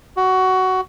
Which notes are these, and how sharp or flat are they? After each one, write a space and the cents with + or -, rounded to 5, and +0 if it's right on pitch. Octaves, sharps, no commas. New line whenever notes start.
F#4 +15